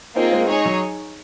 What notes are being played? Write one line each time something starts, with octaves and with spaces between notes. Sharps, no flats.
A#3 C4 D#4 F4 G#4
G#3 C4
G#3 D#4 G#4 C#5
F#3